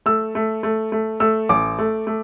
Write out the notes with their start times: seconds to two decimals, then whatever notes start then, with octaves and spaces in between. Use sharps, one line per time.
0.06 A3 E6
0.35 A3
0.63 A3
0.92 A3
1.20 A3 E6
1.49 A1 D6
1.79 A3
2.07 A3